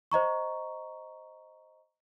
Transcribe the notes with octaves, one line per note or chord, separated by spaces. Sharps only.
C5 D#5 A#5 C#6